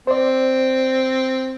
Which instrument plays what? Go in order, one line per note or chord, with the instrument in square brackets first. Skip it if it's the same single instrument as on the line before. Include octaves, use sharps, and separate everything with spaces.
[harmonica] C4 [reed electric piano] C5 D5